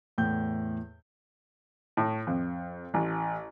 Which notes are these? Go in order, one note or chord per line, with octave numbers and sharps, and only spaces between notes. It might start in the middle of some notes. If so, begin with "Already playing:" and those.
E2 A2 G5 G6
A2
F2
A1